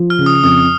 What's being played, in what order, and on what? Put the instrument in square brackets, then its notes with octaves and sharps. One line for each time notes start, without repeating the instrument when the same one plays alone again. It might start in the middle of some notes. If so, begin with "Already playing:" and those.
Already playing: [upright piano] F3
[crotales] F6
[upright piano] C#3
[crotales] D#6
[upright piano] F2 [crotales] D#6